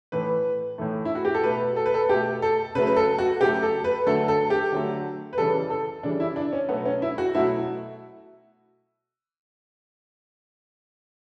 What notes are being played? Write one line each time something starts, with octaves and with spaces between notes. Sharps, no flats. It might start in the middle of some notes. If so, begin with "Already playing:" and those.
A2 E3 A3 B4
A2 E3 A3
E4
F#4
G4
A4
B2 A3 B4
A4
B4
A4
B2 A3 G4
A4
C#3 F#3 A3 B4
B4
A4
F#4
C#3 F#3 A3 G4
A4
B4
D3 F#3 A3 A4
A4
G4
D3 F#3 A3
B4
C#3 E3 G3 A4
A4
C#3 E3 G3 D4
E4
D4
C#4
B2 F#3 A3 B3
C#4
E4
F#4
B2 F#3 A3 E4